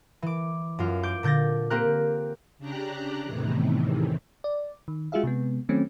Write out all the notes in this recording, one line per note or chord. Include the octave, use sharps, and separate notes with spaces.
E3 D6
F#2 F4
D6 G6 D7
A#2 D3 G6 A6 A#6
A#3 C4 G4 A#4 F#6
C#3 D4 G4 A#5 F#6
E2 A2 C3 D#3 E3
D5
D#3
G#3 F4 F#4 G#4 E5 F5
C3 G#3 B3
D#3 F#3 A3 C4 C#4